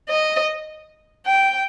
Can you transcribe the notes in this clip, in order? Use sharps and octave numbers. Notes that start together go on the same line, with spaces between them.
D#5
G5